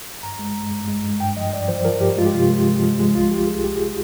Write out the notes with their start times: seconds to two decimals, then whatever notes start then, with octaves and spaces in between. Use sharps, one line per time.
0.23 G2 A#5
0.39 G#3
0.55 G2
0.71 G2
0.88 G#3
1.03 G2
1.20 G2 G5
1.37 F3 D#5
1.53 G2 D5
1.68 F3 C5
1.85 F3 A#4
2.01 G2 G4
2.17 G#3 F4
2.26 G4
2.33 C3 F4
2.50 G#3
2.67 F3
2.83 F3
3.00 G#3
3.15 C2 F4
3.31 C2 G4
3.47 C2 G#4
3.64 C2 G4
3.80 G#4